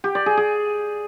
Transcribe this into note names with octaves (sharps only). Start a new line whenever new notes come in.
G4
D5
G#4
G#4